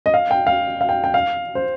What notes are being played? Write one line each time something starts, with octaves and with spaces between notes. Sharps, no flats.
D#5
F5
G5
F5
F5
G5
G5
F5
C5